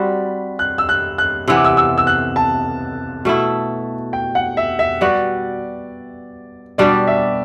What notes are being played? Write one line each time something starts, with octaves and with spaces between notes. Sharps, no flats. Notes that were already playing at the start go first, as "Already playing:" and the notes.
Already playing: G3 C4 F#4 B5
F#6
E6
F#6
F#6
C3 E3 B3 E6
D6
E6
E6
E6
F#6
A5
B2 A3 E4
G5
F#5
E5
E5
G3 B3 F#4 D5
B2 G3 D4 G4 D5
E5